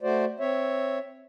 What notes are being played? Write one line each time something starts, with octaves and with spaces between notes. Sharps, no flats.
A3 F#4 C5 D5
C4 C#5 E5